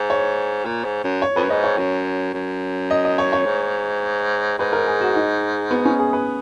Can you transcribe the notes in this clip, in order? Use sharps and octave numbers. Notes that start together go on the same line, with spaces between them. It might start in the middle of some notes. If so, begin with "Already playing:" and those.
Already playing: G#2
C#5
A#2
G#2
F#2
C#5
F2 B4
F#2
G#2 D#5
C#5
F#2
F#2
D#5
D#5
C#5
C#5
G#2
G#2 B4
A#4
G#4
F#4
D#4
B3
C#4
G#4
B4